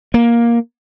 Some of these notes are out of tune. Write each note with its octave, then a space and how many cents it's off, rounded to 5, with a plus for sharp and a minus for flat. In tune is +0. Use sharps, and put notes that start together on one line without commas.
A#3 +10